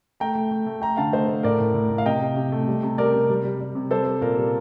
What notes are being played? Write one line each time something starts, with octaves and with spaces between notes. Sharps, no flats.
A3 G5 A#5
A3
A3
A3
A3 G5 A#5
D3 F5 A5
A3 C5 D#5
A3
A2 A#4 D5
A2
A2
A2
F5
C3 D#5 G5
C3
C3
A3
G3
C3
G3 A#4 D5
C3
G3
G3
G3
C3
G3 A4 C5
G3
A#2 A#4
G3